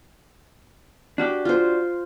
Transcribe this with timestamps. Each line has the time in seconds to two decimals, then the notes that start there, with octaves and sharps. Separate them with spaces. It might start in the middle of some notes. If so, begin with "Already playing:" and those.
1.18 D4 F#4 G4
1.45 F4 C5